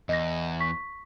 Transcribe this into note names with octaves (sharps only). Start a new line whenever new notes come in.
E2 D#5 A#6
C#6 B6